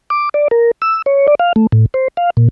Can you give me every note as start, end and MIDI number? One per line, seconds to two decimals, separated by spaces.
0.10 0.29 86
0.34 0.48 74
0.51 0.71 70
0.82 1.02 88
1.06 1.27 73
1.28 1.35 74
1.40 1.53 77
1.56 1.67 57
1.72 1.86 45
1.94 2.08 72
2.17 2.30 77
2.37 2.48 46